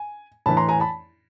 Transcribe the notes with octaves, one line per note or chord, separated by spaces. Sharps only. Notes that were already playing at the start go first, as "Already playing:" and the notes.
Already playing: G#5
A2 E3 A5 B5
A#5 C6
G#5 A#5
A5 B5